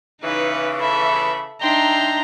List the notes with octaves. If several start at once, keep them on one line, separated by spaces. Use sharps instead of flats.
C#3 E3 D#4 B4
A4 E5 B5
D4 D#4 E5 G5 A#5 C6